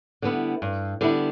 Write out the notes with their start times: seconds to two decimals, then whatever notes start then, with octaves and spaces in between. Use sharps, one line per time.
0.22 D3 G3 B3 E4
0.62 G2
1.01 D3 G3 B3 E4